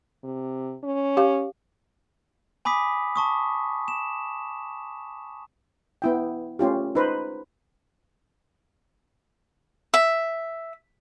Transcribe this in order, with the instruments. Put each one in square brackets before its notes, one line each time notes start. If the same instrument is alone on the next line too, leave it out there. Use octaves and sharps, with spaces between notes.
[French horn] C3
C#4
[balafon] G4 F5
[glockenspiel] G#5 B5 D6 D#6 B6
A5 C#6 D#6
E7
[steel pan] B3 E4 G5
A3 C#4 F4 G4
D#4 B4 C5
[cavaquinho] E5